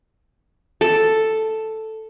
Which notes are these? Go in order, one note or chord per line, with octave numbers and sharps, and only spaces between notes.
A4